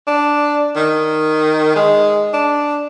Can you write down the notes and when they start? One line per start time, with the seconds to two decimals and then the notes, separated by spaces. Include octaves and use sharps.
0.08 D4
0.76 D#3
1.76 G#3
2.34 D4